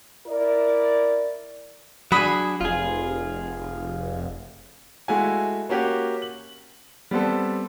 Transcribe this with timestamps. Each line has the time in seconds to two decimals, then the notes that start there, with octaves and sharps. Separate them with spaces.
0.27 E4 A#4 D5
2.12 F#3 D4 G#4 B5 D#6
2.61 F1 F4 G#4
5.08 G#3 A3 E4 F#4 F5 G#5
5.69 A#3 C#4 F#4 G4
6.22 F#7
7.11 G3 B3 C4 A4